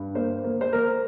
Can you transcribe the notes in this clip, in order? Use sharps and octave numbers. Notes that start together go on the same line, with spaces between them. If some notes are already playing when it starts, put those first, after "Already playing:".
Already playing: G2
A#3 C5
A#3
C5
A#3 A#4